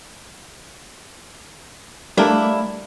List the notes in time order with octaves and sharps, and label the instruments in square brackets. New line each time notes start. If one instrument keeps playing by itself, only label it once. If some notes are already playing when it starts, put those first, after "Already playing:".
[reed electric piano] G3 A3 [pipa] A#3 D4 E4